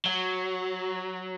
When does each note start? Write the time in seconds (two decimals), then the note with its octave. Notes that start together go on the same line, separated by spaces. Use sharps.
0.06 F#3